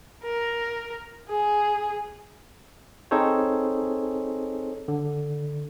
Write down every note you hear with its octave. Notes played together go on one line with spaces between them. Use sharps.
A#4
G#4
C4 D#4 G#4 A4 C5 C#5
D3